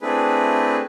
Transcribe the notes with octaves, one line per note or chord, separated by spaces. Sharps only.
A3 C4 D4 E4 G#4 B4